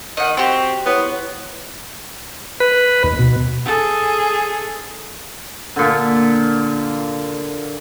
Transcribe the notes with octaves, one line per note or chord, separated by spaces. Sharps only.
D#3 D#5 F#5
C4 F#4 G4 G5
B3 E4 C#5
B4
D#2
B2
G#4 A4
A#2 D3